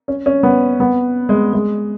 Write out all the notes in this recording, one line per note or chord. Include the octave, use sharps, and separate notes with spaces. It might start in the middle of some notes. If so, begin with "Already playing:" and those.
C#4
C#4
B3
B3
G#3
G#3